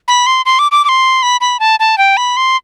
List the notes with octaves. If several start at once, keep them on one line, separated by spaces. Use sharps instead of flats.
B5
C6
C6
D6
D6
D6
C6
B5
B5
A5
A5
G5
B5
C6